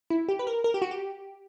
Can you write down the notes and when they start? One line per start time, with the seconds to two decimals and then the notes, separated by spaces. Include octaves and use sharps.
0.10 E4
0.29 G4
0.39 B4
0.47 A#4
0.64 A#4
0.74 G4
0.82 F#4
0.91 G4